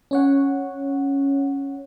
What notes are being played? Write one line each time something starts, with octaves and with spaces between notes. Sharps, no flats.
C#4 C#5 F#5